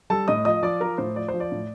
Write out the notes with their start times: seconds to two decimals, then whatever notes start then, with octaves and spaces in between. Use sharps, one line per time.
0.10 G3 A4 A5
0.28 A2 D#5 D#6
0.45 F3 D#5 D#6
0.63 F3 D5 D6
0.81 F3 A#4 A#5
0.98 A2 C5
1.16 F3 D5
1.28 C5
1.34 F3
1.40 D5
1.52 A2